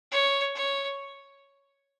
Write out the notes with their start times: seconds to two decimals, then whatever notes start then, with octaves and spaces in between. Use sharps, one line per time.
0.12 C#5
0.55 C#5